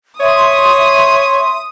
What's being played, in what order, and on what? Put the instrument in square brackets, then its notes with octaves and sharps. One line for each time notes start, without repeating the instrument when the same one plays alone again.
[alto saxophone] C#5 [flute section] E5 C6 [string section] D#6